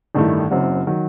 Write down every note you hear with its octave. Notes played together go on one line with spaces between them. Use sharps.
A1 G2 D#3 A3 E4
F#1 F#2 F#3 C4 F#4
D#3 F#3